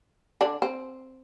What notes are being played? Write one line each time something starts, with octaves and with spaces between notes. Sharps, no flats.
D3 D4
C4